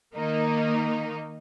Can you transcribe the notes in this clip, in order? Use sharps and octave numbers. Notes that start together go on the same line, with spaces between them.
D#3 A#3 D#4